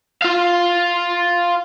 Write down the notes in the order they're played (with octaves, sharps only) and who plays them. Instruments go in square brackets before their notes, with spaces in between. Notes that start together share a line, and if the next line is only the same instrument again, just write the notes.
[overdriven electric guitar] F4 F5